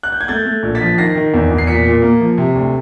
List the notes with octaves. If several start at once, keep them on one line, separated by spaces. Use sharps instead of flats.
F#6
G6
G#6
A3 G6 A6
A3
A#1
A6 B6
F3
D#3 A#6 C7
D#3
E2
E2
C7
A#2 B6 C#7
A#2
A#3
F3
C3
D2